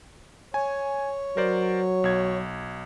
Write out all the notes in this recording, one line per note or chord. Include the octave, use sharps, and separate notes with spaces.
C#5 G#5
F#3 A#4 C5 D5
B1 G#6